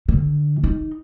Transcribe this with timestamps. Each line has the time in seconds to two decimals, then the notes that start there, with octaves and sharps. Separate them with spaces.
0.08 D3
0.64 D#4